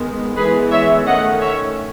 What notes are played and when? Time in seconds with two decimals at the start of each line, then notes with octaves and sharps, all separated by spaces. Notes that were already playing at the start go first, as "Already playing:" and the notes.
Already playing: D#3 G#3 B3
0.36 E3 G#3 B3 G#4 B4
0.71 C#5 E5
1.06 D#3 A3 C#4 D#5 F#5
1.40 C#5 E5